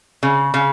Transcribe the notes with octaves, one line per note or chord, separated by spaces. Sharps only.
C#3
C#3